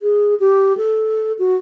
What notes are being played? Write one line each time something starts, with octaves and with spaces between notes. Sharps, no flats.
G#4
G4
A4
F#4